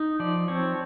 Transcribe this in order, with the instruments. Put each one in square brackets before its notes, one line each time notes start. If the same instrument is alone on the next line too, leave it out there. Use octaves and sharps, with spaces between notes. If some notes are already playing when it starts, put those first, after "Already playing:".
Already playing: [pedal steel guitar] D#4
F3 D5
C4 C#5